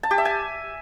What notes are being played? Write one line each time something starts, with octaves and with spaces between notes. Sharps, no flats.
A5
G4
E5
G#5